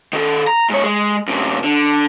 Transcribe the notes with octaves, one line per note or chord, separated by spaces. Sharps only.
D#3 A4
A#5
G#2 C#5
G#3
F#2 C3
D3